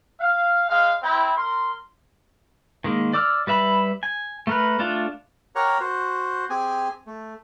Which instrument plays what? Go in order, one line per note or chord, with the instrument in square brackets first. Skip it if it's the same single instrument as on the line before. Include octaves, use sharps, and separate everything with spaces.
[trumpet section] F5
G#3 F5
C4 E4
A#4 C6
[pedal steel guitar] D#3 G#3 A#3
D5 D6 E6 F6
G3 B4 E5 B5
G#5
A3 A#4 B4
A3 D4 F4
[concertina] G4 A#4 C#5 F#5 A#5
F#4 C5
C4 G4 G#4 G#5
A3